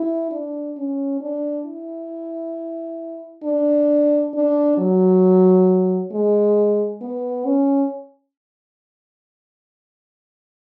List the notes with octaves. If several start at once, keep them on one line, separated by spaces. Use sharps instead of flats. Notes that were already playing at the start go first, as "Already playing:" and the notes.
Already playing: E4
D4
C#4
D4
E4
D4
D4
F#3
G#3
B3
C#4